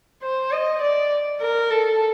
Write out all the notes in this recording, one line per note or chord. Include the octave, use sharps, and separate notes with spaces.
C5
D#5
D5
A#4
A4